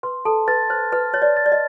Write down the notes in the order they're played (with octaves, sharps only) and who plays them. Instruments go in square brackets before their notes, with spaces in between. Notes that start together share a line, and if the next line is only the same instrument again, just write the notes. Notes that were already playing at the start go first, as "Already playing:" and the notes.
[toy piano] B4 [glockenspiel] C6
[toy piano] A4 [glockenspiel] A5
[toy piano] B4 [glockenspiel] A6
[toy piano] C5 [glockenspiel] F6
[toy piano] B4 [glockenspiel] F6
[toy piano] C#5 [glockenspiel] A6
[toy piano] D5
[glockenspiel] A6
[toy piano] D5
D#5